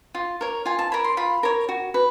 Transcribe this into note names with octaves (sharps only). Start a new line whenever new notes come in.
F4
A#4 C#5
F4 G#5
A5
A#4 C#5 B5
C6
F4 B5
A#4 C#5
F#4
B4